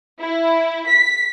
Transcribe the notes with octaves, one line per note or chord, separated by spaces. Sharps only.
E4
B6